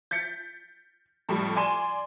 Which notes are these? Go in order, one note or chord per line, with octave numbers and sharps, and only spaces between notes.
G6 A6 B6 C#7
F2 A2 G3
D5 G#5 C6 E7